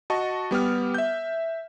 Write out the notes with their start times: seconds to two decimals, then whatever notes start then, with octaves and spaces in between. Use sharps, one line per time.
0.10 F#4 D#5 A5 C#6
0.51 G3 B3 G4 F6
0.94 E5 G6